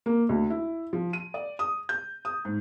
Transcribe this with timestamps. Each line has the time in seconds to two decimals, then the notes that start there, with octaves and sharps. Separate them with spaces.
0.06 A#3
0.29 D2
0.50 E4
0.93 F3
1.13 D#7
1.34 D5
1.59 D#6
1.89 G6
2.25 D#6
2.45 G#2